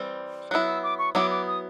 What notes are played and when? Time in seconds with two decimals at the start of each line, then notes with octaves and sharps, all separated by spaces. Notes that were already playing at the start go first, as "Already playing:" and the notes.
Already playing: E3 G3 C4
0.51 F#3 B3 E4 F#6
0.68 E6
0.83 D6
0.99 C#6
1.15 F#3 B3 E4 D6
1.31 D6
1.47 D#6